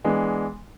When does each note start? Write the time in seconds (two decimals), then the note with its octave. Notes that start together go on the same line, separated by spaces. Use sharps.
0.04 E3 G#3 B3 D4